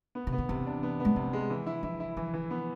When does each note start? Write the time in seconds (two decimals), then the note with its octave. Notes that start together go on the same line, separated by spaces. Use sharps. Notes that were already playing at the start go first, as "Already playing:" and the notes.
0.15 B3
0.27 C3
0.33 B3
0.38 D3
0.49 C3 E3
0.66 D4
0.83 B3
1.00 B3
1.05 G#3
1.16 C3 F3
1.33 G#3
1.50 E3
1.67 E4
1.83 F3 E4
2.00 E4
2.17 E3 F3
2.34 E3
2.51 B3